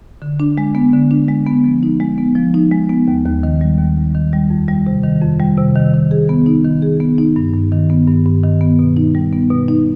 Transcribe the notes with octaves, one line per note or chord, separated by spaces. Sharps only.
D3
D4
G#3
B3
D3
D4
G#3
B3
F3
D#4
G#3
B3
F3
D#4
G#3
B3
D#2
D#2
D#3
G3
D#2
D#2
D#3
G3
F2
G3
C3
D#3
F2
G3
C3
D#3
D#3
G#4
B3
D#4
D#3
G#4
B3
D#4
G2
G2
D#3
B3
G2
G2
D#3
B3
B2
D#4
G3
B3
B2
D#4